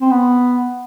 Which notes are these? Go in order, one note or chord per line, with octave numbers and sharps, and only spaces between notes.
C4
B3